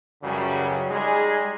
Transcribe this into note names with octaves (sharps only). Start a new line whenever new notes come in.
C#2 F#2 C#3 E3 F#3 G3
G3 G#3 D#4 G#4